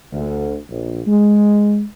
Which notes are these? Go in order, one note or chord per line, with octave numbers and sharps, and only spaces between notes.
D2
A#1
G#3